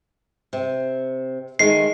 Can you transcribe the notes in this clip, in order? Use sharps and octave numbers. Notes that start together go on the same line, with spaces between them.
C3
D#3 G#3 A3 C7